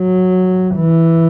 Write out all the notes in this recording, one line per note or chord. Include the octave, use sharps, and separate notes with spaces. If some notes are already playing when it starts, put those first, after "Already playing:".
Already playing: F#3
E3